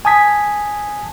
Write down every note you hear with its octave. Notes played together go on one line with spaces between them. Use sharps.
G#5 A5 D#6 G#6 B6